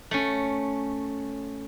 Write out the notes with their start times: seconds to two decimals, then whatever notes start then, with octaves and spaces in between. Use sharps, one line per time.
0.11 A3 C#4